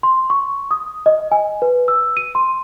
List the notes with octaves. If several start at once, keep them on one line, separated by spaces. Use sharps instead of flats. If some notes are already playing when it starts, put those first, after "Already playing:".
C6
C#6
D#6
D#5
G#5
B4
E6
D#7
C6